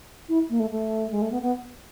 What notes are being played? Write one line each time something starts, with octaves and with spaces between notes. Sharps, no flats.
E4
A#3
A3
A3
G#3
A3
B3
B3